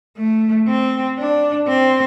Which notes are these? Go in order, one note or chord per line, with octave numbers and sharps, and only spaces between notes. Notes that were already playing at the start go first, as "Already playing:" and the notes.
A3
C4
D4
C4